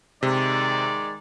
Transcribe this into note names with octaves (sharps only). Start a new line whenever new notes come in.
C3 D#3 G#3 D5